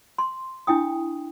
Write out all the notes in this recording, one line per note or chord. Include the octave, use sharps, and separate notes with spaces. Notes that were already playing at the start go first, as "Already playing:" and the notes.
C6
D4 E4 G5 D#6